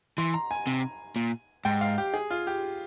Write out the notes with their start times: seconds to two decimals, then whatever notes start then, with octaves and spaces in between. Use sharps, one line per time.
0.18 E3 C6
0.34 A#5
0.51 G#5
0.67 C3
1.16 A#2
1.65 G#2 G5
1.81 F5
1.98 G4
2.14 G#4
2.30 F4
2.47 G4